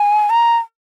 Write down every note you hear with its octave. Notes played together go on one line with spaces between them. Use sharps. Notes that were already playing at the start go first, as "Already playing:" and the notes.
Already playing: G#5
A#5